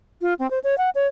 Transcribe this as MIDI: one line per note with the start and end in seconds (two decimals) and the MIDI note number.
0.21 0.34 65
0.39 0.49 60
0.51 0.59 72
0.64 0.75 73
0.78 0.90 78
0.95 1.07 73